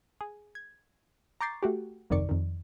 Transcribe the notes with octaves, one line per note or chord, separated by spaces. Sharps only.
G#4
G#6
A#5 C#6 D6 G6 A6 C7
A3 F#4 G4
G1 C2 F2 D#3 D5 C#6
F2 D#3